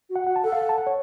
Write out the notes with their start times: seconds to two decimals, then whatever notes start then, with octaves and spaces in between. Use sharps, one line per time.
0.10 F#4
0.16 F#5
0.27 F#4 F#5
0.36 A5
0.44 A4 F#5
0.52 F5
0.61 F#5
0.69 A5
0.78 F#5
0.87 C#5